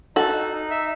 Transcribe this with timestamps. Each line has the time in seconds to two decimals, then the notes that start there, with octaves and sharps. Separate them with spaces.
0.16 D#4 F#4 A4
0.34 D#4
0.53 D#4
0.71 E5